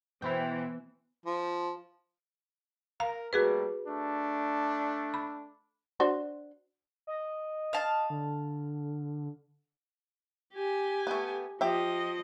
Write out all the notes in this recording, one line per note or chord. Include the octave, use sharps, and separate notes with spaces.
B2 E3 E4 C5 G5
F3
A#4 F5 A#5
G3 A3 A#3 F#4 G#4 B4
A3 D4
B5
D4 F#4 C5
D#5
F5 A5
D3
G4 G#5
A3 B3
F3 G4 D#5 E5